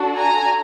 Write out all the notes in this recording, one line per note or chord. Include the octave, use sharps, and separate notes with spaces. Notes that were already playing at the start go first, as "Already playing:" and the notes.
Already playing: D4 F#4 A4
G#5 A#5